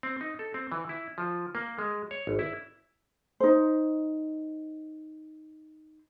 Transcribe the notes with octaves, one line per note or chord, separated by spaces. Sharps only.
C4
D#4
A4
C4
E3
E4
F3
A#3
G#3
C#5
G#1
E4
D#4 C5